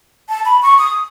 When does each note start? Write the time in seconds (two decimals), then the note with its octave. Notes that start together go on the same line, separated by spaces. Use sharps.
0.29 A5
0.45 B5
0.62 C#6
0.78 D#6